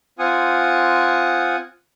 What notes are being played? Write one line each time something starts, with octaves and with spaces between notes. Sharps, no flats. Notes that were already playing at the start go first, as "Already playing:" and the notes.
C4 F4 F#5 G#5 D#6